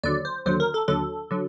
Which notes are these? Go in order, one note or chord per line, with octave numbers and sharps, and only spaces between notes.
D#2 D3 F#3 D5
C5
D#2 D3 F#3 C5
A#4
A4
D#2 D3 F#3 A4
D3 F#3